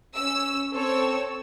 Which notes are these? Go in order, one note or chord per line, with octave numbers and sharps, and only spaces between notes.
C#4 E6
C4 A4 C#5 E6